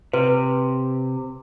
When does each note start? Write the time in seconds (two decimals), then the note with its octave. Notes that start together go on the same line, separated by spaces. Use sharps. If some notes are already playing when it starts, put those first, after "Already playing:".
0.13 C3 B4